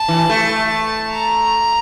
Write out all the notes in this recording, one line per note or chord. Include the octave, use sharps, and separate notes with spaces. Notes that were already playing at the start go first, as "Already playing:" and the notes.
Already playing: A5
E3
A3
A#5